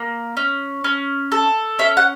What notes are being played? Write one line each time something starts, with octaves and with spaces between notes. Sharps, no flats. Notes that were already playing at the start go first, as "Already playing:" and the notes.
Already playing: A#3
C#4
C#4
A4
C#4 E5
F#5